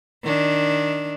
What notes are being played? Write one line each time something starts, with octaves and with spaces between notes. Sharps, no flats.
D#3 D4